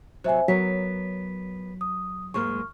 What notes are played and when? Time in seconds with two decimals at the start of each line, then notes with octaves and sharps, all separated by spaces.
0.24 C3 F#3 C5 E5 G#5
0.48 F#3 B3 A#4 C#5 B6
1.81 D#6
2.34 G#2 G#3 A#3 C#6 F6